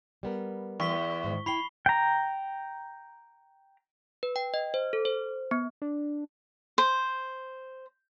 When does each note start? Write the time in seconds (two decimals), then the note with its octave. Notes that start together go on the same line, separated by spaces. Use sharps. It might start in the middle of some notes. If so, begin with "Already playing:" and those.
0.23 G3 B3 A#4
0.80 E2 C#6 B6 G7
1.24 G#2 D#3
1.46 E4 G5 B5 C7 G7
1.86 G5 A#5
4.23 B4
4.36 G5
4.54 D#5
4.74 C5
4.93 A4
5.05 C5
5.51 B3
5.82 D4
6.78 C5